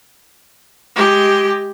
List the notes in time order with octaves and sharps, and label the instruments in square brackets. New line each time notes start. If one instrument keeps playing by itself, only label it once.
[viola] G#3 G4